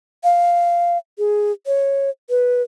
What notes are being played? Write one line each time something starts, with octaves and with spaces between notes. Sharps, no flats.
F5
G#4
C#5
B4